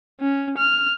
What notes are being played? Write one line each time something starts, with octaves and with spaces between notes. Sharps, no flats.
C#4
F6